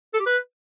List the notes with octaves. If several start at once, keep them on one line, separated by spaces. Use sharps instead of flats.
A4
G4
B4